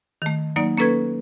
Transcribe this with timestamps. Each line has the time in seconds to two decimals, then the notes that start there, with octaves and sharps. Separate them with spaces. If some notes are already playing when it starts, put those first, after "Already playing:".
0.22 D#3 A3
0.56 F#3 A#3 D#4 D5
0.78 A#3 C#4 A4 B4 C#6 G#6